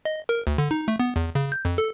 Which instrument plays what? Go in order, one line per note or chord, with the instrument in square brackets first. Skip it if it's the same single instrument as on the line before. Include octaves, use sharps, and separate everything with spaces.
[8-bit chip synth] D#5
A#4
D2
D3
D#4
A3
B3
E2
C#3
G6
F2
A4